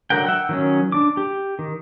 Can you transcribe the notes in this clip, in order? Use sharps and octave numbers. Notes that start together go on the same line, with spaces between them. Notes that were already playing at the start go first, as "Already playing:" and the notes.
D3 F#3 A#4 F#5 G5
E5 F#5 G5
D#3 F#3 C#4
D4 D6
G4
D#3